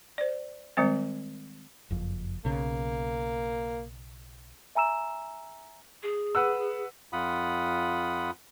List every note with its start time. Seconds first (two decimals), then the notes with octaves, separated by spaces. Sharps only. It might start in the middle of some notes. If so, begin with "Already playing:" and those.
0.18 C5 D5
0.77 D#3 G3 G#3 C4 C5
1.90 F#1 F2
2.45 B1 C#3 A#3
4.75 E5 G#5 A#5 E6 E7
6.02 G#4
6.35 B4 F#5 E6
7.13 F2 F4 F#5 B5 D#6